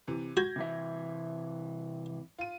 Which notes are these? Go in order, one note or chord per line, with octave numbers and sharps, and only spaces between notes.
C3 E3
F#4 G6 G#6 A#6
C3 E3 E5
F4 D#7